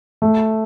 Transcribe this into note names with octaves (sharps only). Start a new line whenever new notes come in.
A3